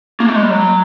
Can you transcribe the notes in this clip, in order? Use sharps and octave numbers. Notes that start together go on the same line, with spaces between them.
A#3
A3
G#3
G3
F#3